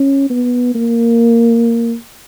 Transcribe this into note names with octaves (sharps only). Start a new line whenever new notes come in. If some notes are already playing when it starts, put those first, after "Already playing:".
Already playing: C#4
B3
A#3